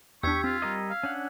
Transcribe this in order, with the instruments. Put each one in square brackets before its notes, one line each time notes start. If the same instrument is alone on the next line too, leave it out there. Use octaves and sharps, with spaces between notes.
[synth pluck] E2 D4 [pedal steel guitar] G4 [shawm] C#6 [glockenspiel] E6 G#6 B6
[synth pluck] C4 [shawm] F4
[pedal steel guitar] G3 A#4 D#5 [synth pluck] D#6
[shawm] F5
[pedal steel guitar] C#4 D4 F#5